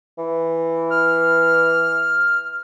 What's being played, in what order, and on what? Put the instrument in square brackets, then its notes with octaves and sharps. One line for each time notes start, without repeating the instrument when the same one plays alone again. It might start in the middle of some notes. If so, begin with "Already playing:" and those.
[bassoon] E3
[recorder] F6